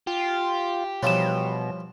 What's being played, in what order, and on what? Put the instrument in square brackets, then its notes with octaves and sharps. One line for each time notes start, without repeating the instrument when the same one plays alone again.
[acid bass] F4 [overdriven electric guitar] G4
[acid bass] B2 [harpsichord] E3 F3 G3 [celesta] C#5 E7